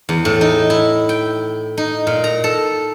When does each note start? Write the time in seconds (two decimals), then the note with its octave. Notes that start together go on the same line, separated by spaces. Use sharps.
0.09 E2
0.25 A2
0.41 D#4
0.70 E4
1.09 G5
1.78 D#4
2.07 A#2
2.24 A#5
2.44 A4